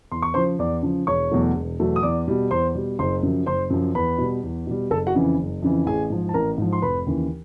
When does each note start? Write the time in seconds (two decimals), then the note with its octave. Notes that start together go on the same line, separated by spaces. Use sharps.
0.11 E2 C6
0.22 C#6
0.34 C#3 F3 C5 C6
0.59 E2 D5 D6
0.83 C#3 F3
1.07 E1 C#5 C#6
1.31 E2 B2 F#3 A3
1.55 E1
1.80 E2 B2 F#3 A3
1.96 D#6
2.03 E2 D5 D6
2.28 B2 G3
2.51 E2 C5 C6
2.75 B2 G3
2.99 F#1 C5 C6
3.23 F#2 C#3 F3
3.46 F#1 C5 C6
3.70 F#2 C#3 F3
3.95 E2 B4 B5
4.18 B2 G3
4.43 E2
4.67 B2 G3
4.90 F#1 A4 A5
5.07 F#4 F#5
5.14 F2 C#3 E3
5.38 F#1
5.62 F2 C#3 E3
5.86 A1 G#4 G#5
6.10 G#2 F3
6.29 A5
6.34 A1 A#4 A#5
6.58 G#2 F3
6.73 C6
6.82 F1 B4 B5
7.06 D#2 C#3 E3